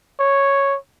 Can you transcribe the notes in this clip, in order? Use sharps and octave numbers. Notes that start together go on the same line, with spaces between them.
C#5